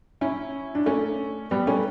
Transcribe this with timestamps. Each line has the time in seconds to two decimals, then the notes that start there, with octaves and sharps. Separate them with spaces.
0.21 C#4 E4
0.75 D4
0.86 A3 C#4
1.51 G3 B3
1.67 A3 C#4